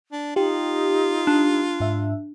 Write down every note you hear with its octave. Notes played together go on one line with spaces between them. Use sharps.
D4
D#4 F4 G4
D4
G#2 E5